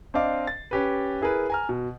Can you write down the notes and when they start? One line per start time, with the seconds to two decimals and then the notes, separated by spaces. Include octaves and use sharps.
0.14 C4 D4 D#5 F5 D6
0.47 A6
0.71 C#4 G4 B4
1.21 E4 G#4 A#4 B4
1.50 G#5 A#5 F6
1.69 B2